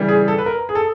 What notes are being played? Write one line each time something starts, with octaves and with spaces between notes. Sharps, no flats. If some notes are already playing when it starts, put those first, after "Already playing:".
Already playing: C#3 E3 G3
G#4
A4
B4
A#4
G#4
A4